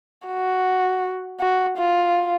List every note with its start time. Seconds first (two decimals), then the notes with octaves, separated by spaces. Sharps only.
0.27 F#4
1.40 F#4
1.78 F4